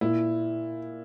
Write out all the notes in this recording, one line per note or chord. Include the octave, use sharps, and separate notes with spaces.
A#2 E4